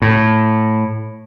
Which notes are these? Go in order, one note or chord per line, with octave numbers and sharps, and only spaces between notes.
A2